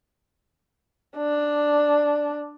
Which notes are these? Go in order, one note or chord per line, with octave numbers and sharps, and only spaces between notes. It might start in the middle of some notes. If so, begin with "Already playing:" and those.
D4